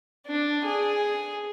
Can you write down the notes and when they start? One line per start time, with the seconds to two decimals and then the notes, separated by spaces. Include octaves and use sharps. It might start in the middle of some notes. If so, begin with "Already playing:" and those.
0.26 D4
0.65 G#4